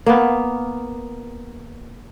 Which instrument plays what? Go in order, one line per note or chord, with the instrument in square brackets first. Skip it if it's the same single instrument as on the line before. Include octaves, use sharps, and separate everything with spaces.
[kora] A#3 B3